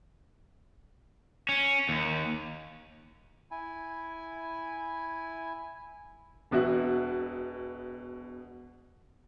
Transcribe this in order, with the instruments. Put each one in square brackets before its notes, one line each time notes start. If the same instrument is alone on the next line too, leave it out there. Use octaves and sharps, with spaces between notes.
[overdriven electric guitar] C#4
D#2
[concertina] E4 G#5
[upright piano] E1 B2 F#4 E5 F#6